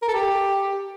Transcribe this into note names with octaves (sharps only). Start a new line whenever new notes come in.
A#4
A4
G4